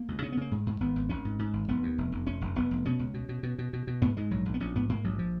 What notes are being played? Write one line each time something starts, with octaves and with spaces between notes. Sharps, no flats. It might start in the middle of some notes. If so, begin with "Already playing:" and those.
Already playing: A#3
C#2
C#3 C#4
B3
C#3 A#3
G#2 G#3
G#2
G#1 B3
G#1
G#1 C#4
G#2
G#2
G#1
F1 B3
D#2
F1
F1
F1 C#4
F1
F1 B3
F1
B2 C#4
C#2
B2
B2
B2
B2
B2
B2
G#2 B3
G#2 G#3
A#1 F#3
A#1
B3
A#1 C#4
G#2 B3
G#2 A#3
A#1 F#3
F3